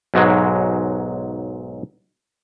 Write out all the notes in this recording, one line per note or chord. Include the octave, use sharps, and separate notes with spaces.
B1 G#2 F#3 G#3